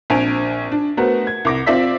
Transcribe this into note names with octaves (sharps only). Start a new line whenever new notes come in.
A#1 C4 G#5 D7 F7
D4
A3 B3 F#4 A#4 C5 F#5
G#6
C2 D6 A#6
C4 F4 C5 D5 E5 B6